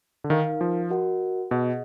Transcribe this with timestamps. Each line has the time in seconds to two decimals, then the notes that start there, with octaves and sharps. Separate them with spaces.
0.24 D3
0.30 D#3 D#4 A#4 F5
0.61 F3
0.90 F#4 A#4 D#5 F#5
1.51 B2 G#4 D#5 F#5